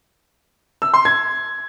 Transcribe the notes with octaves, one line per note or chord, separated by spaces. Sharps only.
E6
C6
G#6